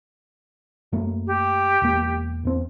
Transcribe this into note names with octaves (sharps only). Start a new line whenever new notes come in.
F#2 A3 A#3
G4
E1 A#3
E2 C4